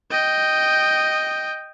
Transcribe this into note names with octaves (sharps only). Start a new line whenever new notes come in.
D#5 G5